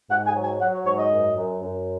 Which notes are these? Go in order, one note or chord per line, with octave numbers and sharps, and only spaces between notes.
G#2 F#5
G#5
F#3
G#5
F#3 F#5
C#5
G#2 C#5
D#5
F#2
F#2
F#2